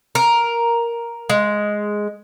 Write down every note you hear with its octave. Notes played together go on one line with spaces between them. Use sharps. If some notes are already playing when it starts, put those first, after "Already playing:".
A#4
G#3